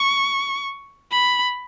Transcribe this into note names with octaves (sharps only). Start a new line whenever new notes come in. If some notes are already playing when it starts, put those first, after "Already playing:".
Already playing: C#6
B5